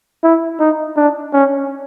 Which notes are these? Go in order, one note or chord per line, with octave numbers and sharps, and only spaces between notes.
E4
D#4
D4
C#4